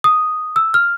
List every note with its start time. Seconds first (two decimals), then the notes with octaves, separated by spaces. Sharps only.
0.04 D#6
0.56 E6
0.74 F6